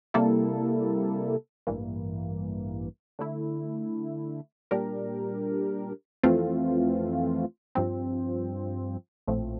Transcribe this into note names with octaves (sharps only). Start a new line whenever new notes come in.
C3 G3 A#3 E4 A4
A1 G2 E3 A#3
D3 A3 E4
A#2 G3 D4 G4 A#4
F2 E3 A3 C4 F4
G2 F3 C4
A#1 A2 F3 A3 C4